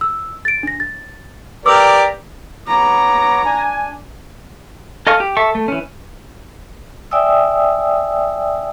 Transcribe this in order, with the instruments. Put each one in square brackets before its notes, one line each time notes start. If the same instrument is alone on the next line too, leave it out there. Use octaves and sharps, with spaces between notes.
[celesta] E6
A6 D7
D4 A#6
A6
[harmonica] G4 A#4 D5 [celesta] B4 D6 E6
[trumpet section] B3 C#5 D6 [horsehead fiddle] A#5
[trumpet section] D4 G#5
[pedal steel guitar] A4 D#5 F5 G#5 C#6
G4
A4 E5 C#6
A3
E3 C#4
[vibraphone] D5 E5 G5 G#5 D#6 E6